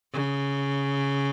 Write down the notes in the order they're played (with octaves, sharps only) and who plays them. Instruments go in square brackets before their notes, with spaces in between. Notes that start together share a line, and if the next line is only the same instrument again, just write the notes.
[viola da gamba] C#3